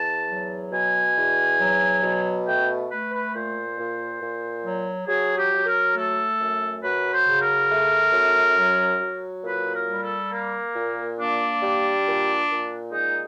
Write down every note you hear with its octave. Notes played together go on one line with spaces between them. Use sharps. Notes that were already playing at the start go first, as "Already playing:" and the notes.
Already playing: E2 A5
F#3
B2 G#5
E2
F#3
B2
A3 G5
A3 B4
B4
A#2 C5
A#2
A#2
F#3
F#3 G#4
G4
F#3
A#4
A3 A4
F#2
F#3 B4
C5
C#3
A#4
A3
F#2
F#3
F#3
A#2 B4
A#4
G3
A4
A#3
A#2
A#3 D4
G3
A#2
A#2
G#3 D#4